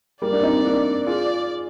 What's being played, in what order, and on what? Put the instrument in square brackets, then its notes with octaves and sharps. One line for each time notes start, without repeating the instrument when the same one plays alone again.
[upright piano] G3 A#3 [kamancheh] D5
[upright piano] A#3 D4
C4 D#4
A#3 D4
[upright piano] F4 G#4 [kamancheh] D5